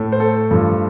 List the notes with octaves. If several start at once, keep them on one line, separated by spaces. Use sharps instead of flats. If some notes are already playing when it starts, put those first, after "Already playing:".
Already playing: A2 A3
C5
A4
G2 F3 A3